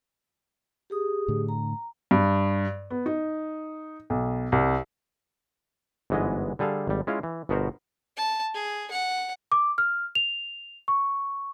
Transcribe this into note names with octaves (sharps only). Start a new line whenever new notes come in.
G4 G#4 D#6
A2 D3
A#5
G2
B3
D#4
B1
C2
G1 G#2 E3 G#3 B3 D#5
D3 G3 G#4 A4 F5
G#1 G3
G#3 C#4 E4 F4 F5
E3
G1 B2 B3 F#4 A#4 C5
A5
G#4
F#5
D6
F6
F7
C#6